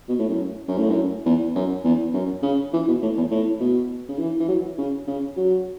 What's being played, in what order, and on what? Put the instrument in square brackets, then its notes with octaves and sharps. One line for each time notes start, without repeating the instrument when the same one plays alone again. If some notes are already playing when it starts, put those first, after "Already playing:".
[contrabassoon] B2
A2
F#2
F#2
A2
F#2
E2
F#2
E2
F#2
C#3
E3
B2
A2
E2
A2
B2
C#3
E3
E3
F#3
C#3
C#3
F#3